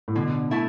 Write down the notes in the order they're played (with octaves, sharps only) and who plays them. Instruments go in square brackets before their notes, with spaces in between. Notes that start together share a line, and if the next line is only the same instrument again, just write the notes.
[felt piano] A2
[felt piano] B2 [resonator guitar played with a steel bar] D3
[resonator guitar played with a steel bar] A3 E4